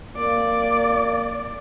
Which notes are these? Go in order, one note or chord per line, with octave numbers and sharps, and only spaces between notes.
A#3 D5